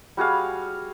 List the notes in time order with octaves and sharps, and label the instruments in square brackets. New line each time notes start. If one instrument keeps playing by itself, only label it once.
[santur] G3 F#4 G#4 F5